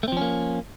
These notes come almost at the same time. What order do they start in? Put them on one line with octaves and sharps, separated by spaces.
A3 C4 F3 C#4 A#3